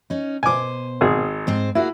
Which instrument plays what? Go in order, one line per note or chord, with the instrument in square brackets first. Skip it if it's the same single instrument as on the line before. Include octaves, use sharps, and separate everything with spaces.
[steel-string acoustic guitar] C#4 D#4
[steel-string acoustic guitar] B2 C5 [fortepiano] G#5 D6
[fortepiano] G#1 G#4
[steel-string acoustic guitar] G#2 C4 C5
[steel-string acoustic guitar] A#3 F#4 G#4 [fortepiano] E4